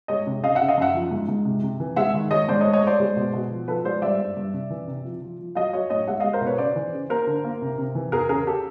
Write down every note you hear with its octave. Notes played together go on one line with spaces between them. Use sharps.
G#3 C#5 D#5
C3
C#3 D#5 F5
E5 F#5
C#3
D#5 F5
F#2 E5 F#5
F3
G#2
G#2
C3
C3
E3
G#3 E5 F#5
D#3
G#3 C#5 D#5
G#2 C5 D5
C#5 D#5
A3
C#5 D#5
A3 C5 D5
G#3
B2
B2
F3
F3 A4 B4
G#3 C5 D5
G3 D5 E5
G2
G2
C3
E3
C3
F3
F3
F3
F#3 D#5 F5
F#3 C#5 D#5
A2 C#5 D#5
G#3 E5 F#5
G#3 D#5 F5
A#4 C5
B2
B4 C#5
C#3 C5 D5
E3
C#3
A#3 A#4 C5
D3
A#3
C3
C3
E3
E2 G#4 A#4
C#3 G#4 A#4
G4 A4